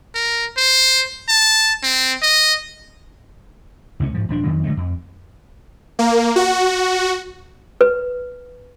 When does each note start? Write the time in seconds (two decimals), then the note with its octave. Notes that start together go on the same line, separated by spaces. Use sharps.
0.15 A#4
0.57 C5
1.28 A5
1.83 C4
2.22 D#5
4.00 C#2 C3 A#3 C#4
4.14 G#2 F3
4.29 D#1 F3 D4
4.44 F2 D#3 F#3
4.64 D3 F#3 G#3 A3
4.77 F2
5.99 A#3
6.36 F#4
7.81 B4